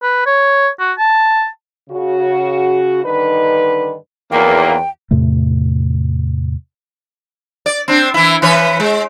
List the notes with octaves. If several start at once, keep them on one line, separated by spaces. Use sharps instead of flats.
B4
C#5
F#4
A5
C#3 F#4
G2 D3 D#3 D#4 B4
E2 D#3 F#3 A#3 G5
E2 A2 C3 A3
D5
C4 D4
E3 E4
E3 B4 C#5
G#3